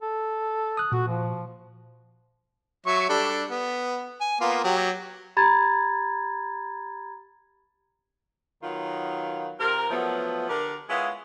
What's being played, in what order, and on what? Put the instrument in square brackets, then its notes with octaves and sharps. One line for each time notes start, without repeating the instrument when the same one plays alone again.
[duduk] A4
[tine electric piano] D#6 F#6
[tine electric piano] A#2 [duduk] F#4
[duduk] F3
[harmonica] F#3 E5 C#6
G3 D4 A4
B3
G#5
A#3 B3 F4
F#3 G4
[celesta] G4 A#5 B5 G#6 A6
[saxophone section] D#3 F#3 B3 F4
C3 F4 A#4
F3 F#3 A3 B3
D3 G4 A#4
G#3 B3 C#4 E4 F4